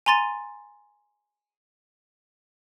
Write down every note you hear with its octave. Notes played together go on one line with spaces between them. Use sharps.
G#5 A#5 C6 A6 D#7